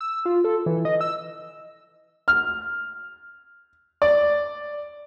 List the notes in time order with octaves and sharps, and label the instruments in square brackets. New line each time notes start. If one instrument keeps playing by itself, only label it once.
[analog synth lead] E6
F4
A4
E3
D#5
E6
[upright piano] F6
D5